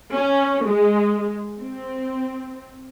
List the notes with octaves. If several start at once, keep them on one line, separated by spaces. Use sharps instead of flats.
C#4
G#3
C4